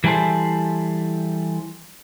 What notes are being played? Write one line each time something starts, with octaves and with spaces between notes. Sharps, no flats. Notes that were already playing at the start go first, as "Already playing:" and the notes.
E3 G3 E4 G#4 A4 C5